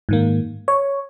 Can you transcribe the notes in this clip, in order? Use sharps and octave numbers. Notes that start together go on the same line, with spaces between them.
G#2 D#3 A#3
C#5